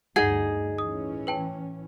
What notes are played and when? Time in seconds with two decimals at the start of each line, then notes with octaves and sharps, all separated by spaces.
0.16 D2 G2 D#4 G#4 F#5 G#6
0.78 A2 E3 C#4 D#6
1.27 B4 G5 A5